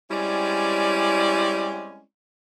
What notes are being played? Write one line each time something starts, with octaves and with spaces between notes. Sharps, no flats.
G3 G#3 C4 C#4 E4 D5